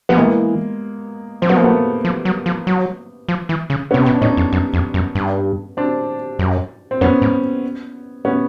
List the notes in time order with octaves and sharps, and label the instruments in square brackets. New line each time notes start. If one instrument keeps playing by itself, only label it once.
[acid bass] F3 [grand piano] B3
[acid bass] E3 [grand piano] G#3 A#3
[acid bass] F3 [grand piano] C4
[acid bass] F#3 [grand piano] B3
[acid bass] F3 [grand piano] A#3
[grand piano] A3 B3
[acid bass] F3
F#3
F3
F#3
F3
E3
C#3
[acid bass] C3 [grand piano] B3 C#4
[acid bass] B2
[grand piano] D4
[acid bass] A2 [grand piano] C#4 D#4
[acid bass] F2
F#2
F2
F#2
G2
[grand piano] C4 D4
[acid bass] F#2
[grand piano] C4
[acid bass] F#2 [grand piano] B3 C#4
[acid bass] G#2
[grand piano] B3 C#4